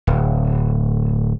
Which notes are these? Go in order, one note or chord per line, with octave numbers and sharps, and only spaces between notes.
D1